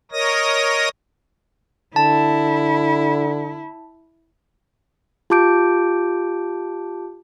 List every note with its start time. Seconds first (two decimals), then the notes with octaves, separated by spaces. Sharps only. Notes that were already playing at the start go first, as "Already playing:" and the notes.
0.12 A#4 C#5 D#5 D#6 A#6
1.96 D3 E4 A5
5.30 F4 G4 A5 D6 G6 D7